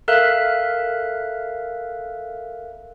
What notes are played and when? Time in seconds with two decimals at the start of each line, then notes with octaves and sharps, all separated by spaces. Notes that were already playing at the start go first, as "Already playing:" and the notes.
0.08 A4 A#4 E5 F5 F#6